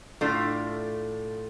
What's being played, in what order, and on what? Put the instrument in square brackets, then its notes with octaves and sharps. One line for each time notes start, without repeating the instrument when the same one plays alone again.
[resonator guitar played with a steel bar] A2 A3 D4 F4